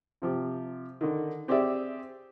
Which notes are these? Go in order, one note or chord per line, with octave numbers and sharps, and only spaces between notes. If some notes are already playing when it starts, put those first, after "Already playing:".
C3 F3 G4
D3 D#3
C4 G4 G#4 D5 E5